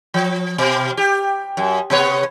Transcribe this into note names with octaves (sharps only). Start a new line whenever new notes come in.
F3
B2
G4
F#2
C3 B3 C#5